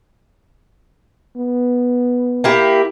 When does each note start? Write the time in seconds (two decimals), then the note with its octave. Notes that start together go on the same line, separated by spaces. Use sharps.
1.36 B3
2.44 A#3 E4 G4